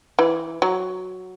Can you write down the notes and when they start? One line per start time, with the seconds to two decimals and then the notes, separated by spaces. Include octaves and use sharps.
0.19 E3
0.62 F#3